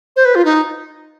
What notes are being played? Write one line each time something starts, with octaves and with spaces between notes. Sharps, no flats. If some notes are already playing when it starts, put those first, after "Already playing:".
C5
B4
F4
D#4